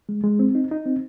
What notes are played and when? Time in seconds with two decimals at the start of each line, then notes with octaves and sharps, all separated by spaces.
0.09 G#3
0.24 G#3
0.39 C4
0.55 D#4
0.71 D#4
0.86 C4